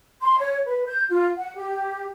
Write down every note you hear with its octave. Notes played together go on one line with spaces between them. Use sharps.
C6
C#5
B4
G6
F4
F#5
G4